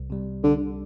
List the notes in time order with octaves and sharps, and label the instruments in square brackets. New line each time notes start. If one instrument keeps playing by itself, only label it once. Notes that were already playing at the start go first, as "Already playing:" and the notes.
Already playing: [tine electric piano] C2
C3 G3
[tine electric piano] C2 [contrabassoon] D3